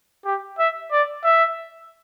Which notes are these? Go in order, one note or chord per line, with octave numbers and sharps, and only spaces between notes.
G4
E5
D5
E5